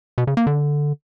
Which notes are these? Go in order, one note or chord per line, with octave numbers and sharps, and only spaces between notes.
B2
C#3
A#3
D3